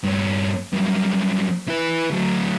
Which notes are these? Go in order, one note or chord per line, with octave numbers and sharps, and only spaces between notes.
G2 C#4
G2 F#3
E4 B4
D2 F#3